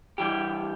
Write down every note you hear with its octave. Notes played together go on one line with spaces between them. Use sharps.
E3 G3 G4